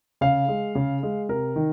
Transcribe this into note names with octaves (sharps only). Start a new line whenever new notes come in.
C#3 F5
G#3
C#3
G#3
C3 A#4
D#3